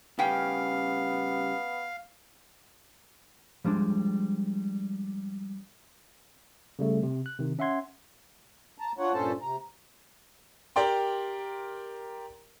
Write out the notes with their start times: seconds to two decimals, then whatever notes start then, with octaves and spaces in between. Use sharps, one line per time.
0.19 C#3 G3 B3 C#4 F5 G5
3.64 F3 G3 G#3 D4
6.79 C#3 G3 A3
7.03 C3
7.26 F#6
7.39 C3 D#3
7.59 C#4 E5 F#5 C6 G#6
8.78 A5 A#5
8.98 D4 F4 C#5 F#5
9.13 G2 A#2 C#4 A4 C5 A5
9.42 C3 A#5
10.76 G4 A#4 D5 G5 C6